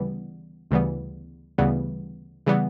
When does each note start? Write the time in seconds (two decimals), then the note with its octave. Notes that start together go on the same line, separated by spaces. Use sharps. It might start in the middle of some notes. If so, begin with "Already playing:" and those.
Already playing: D2 C#3 E3 G3 B3
0.71 D2 C#3 E3 G3 B3
1.58 D2 C#3 E3 G3 B3
2.46 C#3 E3 G3 B3